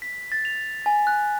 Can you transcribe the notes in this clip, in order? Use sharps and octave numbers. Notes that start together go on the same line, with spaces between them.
B6
A6
F7
G#5
F#6